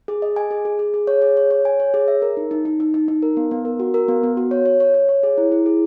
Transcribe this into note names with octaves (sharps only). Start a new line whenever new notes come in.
G#4
D#5
G#5
G#4
G#4
G#4
G#4
C#5
G#4
C#5
C#5
G#5
C#5
G#4
E5
A#4
D#4
D#4
D#4
D#4
D#4
D#4
A#4
B3
B3
A#4
F#4
A#4
B3
B3
F#4
C#5
C#5
C#5
C#5
C#5
G#4
E4
E4
G#4